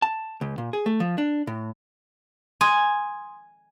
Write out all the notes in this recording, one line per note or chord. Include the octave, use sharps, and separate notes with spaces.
A5
C#2
A#2
G#4
A3
F3
D4
A2
G#5 C6 D#6 G#6